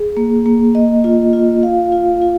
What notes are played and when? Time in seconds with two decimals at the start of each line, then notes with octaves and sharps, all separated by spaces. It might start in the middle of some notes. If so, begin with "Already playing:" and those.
Already playing: G#4
0.17 A#3
0.46 A#3
0.75 D#5
1.04 F4
1.33 F4
1.63 F5
1.92 F4
2.22 F4